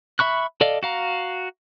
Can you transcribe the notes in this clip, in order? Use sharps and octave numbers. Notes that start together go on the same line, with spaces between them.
E5 B5 C#6 F#6
A4 D5 D#5 F5
F#4 F5 A#5